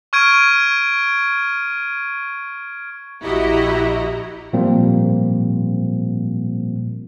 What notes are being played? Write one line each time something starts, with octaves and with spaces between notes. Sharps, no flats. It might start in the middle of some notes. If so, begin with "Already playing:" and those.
C#6 F6 G#6 D7 D#7
A#1 E4 F#4 G4 D#5 A#5
A#2 F3 G3 A#3 C4